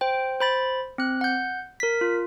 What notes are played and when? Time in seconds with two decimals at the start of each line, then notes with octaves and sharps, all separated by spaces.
0.01 C5 G5
0.41 C5 B5 A6
0.98 C4 F#6
1.21 F#5 G6
1.80 A#4 B6
2.01 F4